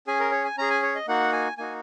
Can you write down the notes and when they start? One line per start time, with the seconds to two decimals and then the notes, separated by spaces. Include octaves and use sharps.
0.07 C#4 G#4 G#5
0.20 A#4
0.32 C#5
0.45 G#5
0.58 C#4 G#4 A#5
0.70 G#5
0.82 C#5
0.95 D#5
1.08 A#3 D#4 F#4 F#5
1.32 G#5
1.58 A#3 D#4 F#4 G#5